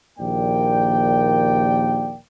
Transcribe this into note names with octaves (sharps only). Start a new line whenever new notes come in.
A#1 D#2 A#3 D5 G5